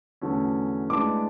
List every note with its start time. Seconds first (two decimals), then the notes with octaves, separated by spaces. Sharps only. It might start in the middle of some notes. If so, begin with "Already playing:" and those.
0.22 E2 D3 F#3 A3 C#4
0.89 A2 G#3 B3 D4 D6